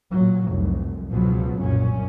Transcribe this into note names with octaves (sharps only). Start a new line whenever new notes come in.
A#2 F#3
F1 C2
C#2 B2 F3 F#3 B3
C2 F#2 A#2 C#4